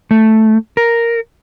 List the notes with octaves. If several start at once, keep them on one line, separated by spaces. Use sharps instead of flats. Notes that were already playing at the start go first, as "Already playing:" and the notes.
A3
A#4